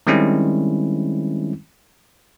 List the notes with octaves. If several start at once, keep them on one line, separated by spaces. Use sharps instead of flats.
D#3 G3 G#3 C4 C#4 E4